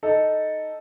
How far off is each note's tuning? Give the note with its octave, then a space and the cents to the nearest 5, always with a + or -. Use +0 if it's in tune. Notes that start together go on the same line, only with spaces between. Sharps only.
D#4 +0 A4 +0